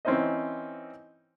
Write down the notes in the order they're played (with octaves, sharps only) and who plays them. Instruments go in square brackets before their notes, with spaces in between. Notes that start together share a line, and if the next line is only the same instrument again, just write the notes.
[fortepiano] E3 C4 C#4 D#4 C5 D#5